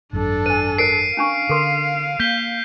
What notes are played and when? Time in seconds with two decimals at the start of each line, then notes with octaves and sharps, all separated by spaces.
0.13 G#1 F#2 D4 A4
0.46 C5 G#5 D#7
0.78 A#4 C5 C7 D7
1.17 C#4 D4 F5 C#6
1.49 D3 A4 A#4 C6
2.20 A#3 G6 B6 G7